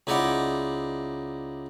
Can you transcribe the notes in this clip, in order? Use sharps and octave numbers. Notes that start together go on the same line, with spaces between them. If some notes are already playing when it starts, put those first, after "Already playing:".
C#2 D#4 E4 D5 F#5